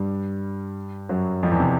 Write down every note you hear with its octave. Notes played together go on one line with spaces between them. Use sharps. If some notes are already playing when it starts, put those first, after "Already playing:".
Already playing: G2 G3
F#2 F#3
F2 F3
E2 E3
C3